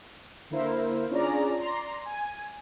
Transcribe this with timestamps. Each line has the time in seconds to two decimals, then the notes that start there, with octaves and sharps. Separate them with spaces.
0.50 D3 A#3 E4 A#4 C5
1.11 C#4 D4 F4 G#4 D5 A#5
1.58 D5 A#5 C6
2.06 G#5